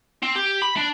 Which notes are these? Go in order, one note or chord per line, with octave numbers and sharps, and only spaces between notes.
C4
G4
B5
D4